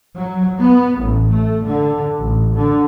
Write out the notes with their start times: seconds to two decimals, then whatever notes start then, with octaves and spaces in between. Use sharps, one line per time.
0.15 F#3
0.57 B3
0.98 A1
1.31 A3
1.64 D3
2.19 A1
2.55 D3